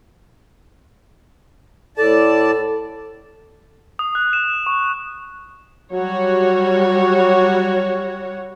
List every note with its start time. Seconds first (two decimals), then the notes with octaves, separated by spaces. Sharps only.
1.97 A2 A4 D5 A5
3.99 D#6
4.15 F#6
4.33 E7
4.66 C#6
5.93 F#3 G3 F#4 C#5